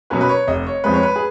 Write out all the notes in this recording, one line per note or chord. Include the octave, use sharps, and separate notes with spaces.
B2 F#3 A#3 C#4 B4
B4
C#5
F1 D#5
C#5
F2 F3 G#3 B4
C#5
B4
G#4